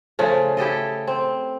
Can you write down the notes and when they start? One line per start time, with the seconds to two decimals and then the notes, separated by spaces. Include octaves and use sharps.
0.19 C#3 F3 A3
0.57 E4 G4 A4 D#5
1.07 C4